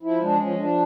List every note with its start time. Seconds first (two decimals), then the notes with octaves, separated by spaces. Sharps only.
0.03 F3 E4
0.20 G#3 D4
0.40 F3 C#4
0.58 F3 D4